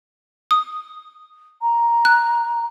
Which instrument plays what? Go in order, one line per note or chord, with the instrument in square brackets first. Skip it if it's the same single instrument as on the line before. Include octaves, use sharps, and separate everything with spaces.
[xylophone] D#6
[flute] A#5
[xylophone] F#6